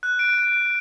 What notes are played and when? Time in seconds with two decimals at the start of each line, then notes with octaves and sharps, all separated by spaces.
0.03 F#6
0.19 D7